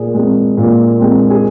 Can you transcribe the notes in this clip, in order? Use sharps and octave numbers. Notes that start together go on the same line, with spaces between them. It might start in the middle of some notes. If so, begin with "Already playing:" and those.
Already playing: A#2 G#4
G#3 C4
A#2
G#3 C4
G#4